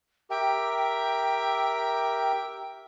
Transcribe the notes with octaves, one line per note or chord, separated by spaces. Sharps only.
G4 A#4 E5 G5